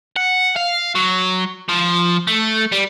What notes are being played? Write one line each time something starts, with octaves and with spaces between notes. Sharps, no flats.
F#5
F5
F#3
F3
A3
G3